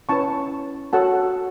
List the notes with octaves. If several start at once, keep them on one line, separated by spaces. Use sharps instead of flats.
C#4 E4 B4 A5 C#6
F#4 A4 C#5 F#5 A5